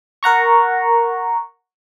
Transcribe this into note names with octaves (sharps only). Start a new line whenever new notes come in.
A#4 F#5 A#5 C#6